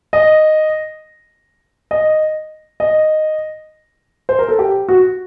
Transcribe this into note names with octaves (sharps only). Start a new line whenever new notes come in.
D#5
D#5
D#5
C5
A#4
A4
G4
F#4